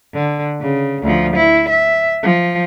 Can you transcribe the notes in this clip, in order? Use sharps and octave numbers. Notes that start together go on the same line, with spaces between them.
D3
C#3
D2 F3
E4
E5
F3